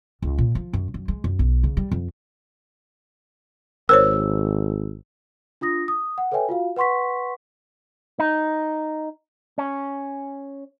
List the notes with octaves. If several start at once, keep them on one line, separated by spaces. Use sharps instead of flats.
C#2
A#2
F3
F#2
F#2
G#3
F#2
B1
C#3
G3
F2
G#1 A#4 C5 C#5 E6
D4 F4 D#6 A#6
D#6
F#5
A4 B4 C#5 E5 G5 G#5
F4 F#4 F5
B4 F#5 C6 C#6 B6
D#4
C#4